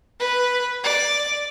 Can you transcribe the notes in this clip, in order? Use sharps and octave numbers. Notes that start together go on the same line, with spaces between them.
B4
D5